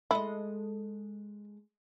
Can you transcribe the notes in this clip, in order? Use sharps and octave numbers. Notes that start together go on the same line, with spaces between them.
G#3 E4 A4 D#5